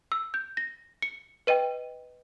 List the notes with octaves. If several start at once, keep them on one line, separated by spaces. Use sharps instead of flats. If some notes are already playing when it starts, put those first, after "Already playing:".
E6
G6
A#6
C#7
B4 D#5 G5 D#7